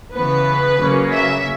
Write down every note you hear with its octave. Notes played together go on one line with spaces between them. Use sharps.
C#3 E3 B3 B4
C#3 F#3 A#3 C#4
E5